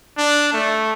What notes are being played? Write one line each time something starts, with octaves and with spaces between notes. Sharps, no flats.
D4
A3